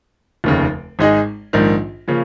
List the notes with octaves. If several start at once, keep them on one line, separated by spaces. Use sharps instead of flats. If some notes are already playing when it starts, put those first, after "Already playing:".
F1 D#2 C#3
G#1 G#2 G#3 D#4 G#4
A#1 G#2 D#3
C#3 F3 A#3 C#4